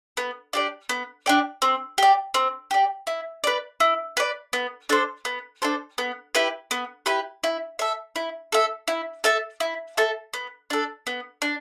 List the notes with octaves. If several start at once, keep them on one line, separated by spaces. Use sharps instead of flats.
B3
D4 G4 D5
B3
D4 G4 D5
C4
G4 D5
C4
G4 D5
E4
B4 D5
E4
B4 D5
B3
D4 A4 C5
B3
D4 A4 C5
B3
E4 G4 B4
B3
E4 G4 B4
E4
A4 E5
E4
A4 E5
E4
A4 E5 A5
E4
A4 E5 A5
B3
D4 A4
B3
D4